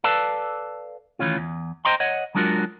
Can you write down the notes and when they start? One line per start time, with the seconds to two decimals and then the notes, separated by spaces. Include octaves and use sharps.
0.04 A4 B4 D5 F5 A5
1.19 D#3 E3 A3 C#4 F4
1.38 E2
1.85 C5 D#5 G5 A#5 C6
2.00 C#5 D#5 F#5
2.35 F#3 G#3 D4 F4 F#4 A#4